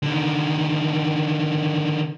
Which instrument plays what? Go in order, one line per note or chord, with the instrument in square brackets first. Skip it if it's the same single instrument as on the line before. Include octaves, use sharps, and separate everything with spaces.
[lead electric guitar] D3 D#3